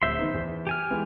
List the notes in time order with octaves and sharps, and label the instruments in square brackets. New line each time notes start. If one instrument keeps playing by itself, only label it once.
[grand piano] D1 [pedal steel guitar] C5 E5 C6
[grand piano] D#3 B3 D#4
E2
[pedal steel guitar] G4 G#5 F6
[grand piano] E3 G#3 B3